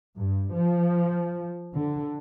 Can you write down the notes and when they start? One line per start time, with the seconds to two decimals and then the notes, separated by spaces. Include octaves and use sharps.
0.17 G2
0.53 F3
1.75 D3